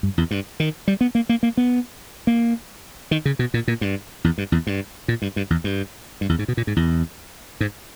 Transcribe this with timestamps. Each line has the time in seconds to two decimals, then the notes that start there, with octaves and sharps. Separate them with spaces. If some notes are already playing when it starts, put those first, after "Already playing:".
0.03 G2
0.18 E2
0.31 G2
0.60 D#3
0.88 G3
1.01 B3
1.15 A#3
1.29 A#3
1.43 A#3
1.57 B3
2.27 A#3
3.11 D#3
3.25 C#3
3.39 B2
3.54 A#2
3.68 A#2
3.81 G2
4.24 E2
4.38 G2
4.52 E2
4.67 G2
5.08 A#2
5.22 G2
5.36 G2
5.50 E2
5.64 G2
6.21 G2
6.29 E2
6.39 G#2
6.48 B2
6.57 A#2
6.67 G#2
6.76 E2
7.61 G#2